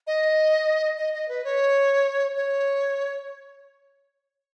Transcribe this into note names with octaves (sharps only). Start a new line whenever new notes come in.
D#5
D#5
D#5
B4
C#5
C#5